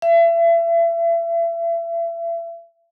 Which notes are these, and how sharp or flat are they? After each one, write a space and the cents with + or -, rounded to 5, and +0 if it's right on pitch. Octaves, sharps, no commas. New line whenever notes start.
E5 +35